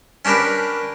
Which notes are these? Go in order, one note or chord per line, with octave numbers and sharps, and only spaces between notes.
C#4 D4 G4 A#4 B4